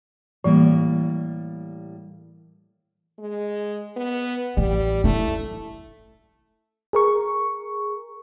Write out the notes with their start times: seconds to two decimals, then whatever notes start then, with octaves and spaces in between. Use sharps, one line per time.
0.44 A2 E3 G3 A#3
3.19 G#3
3.97 B3
4.57 A1 G3
5.04 A3 C#4 E4
6.93 G#4 A#4 C#6